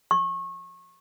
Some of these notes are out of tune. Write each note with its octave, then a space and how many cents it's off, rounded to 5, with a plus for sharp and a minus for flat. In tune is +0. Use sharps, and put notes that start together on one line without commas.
C#6 -30